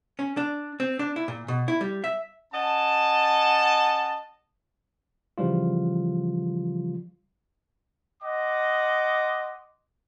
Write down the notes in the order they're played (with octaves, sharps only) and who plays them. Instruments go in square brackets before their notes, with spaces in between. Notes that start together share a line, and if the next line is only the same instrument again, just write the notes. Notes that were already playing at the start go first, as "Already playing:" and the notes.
[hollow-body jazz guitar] C#4
D4
C4
D4
E4
A#2
B2
E4
G3
E5
[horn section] C#4 D#5 F#5 A5
[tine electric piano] C#3 E3 F3 G3 F4
[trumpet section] D#5 F#5 C6 D6